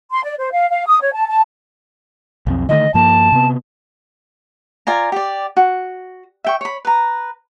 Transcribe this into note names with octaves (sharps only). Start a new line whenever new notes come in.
C6
D5
C5
F5
F5
D#6
C#5
A5
A5
B1 F2 C4
D3 D#3 A3 D#5
G2 F3 A#3 A5
C3 B3
F4 D5 G#5 A#5
G4 D5
F#4
E5 G5 C#6
C#5 B5
B4 A#5